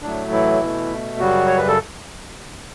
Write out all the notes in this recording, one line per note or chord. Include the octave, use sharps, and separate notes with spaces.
A2 F#3 A3 D4
E3 E4
B2 A3
F#2 C#3 F#3 G3 F#4
C#5
B4
A4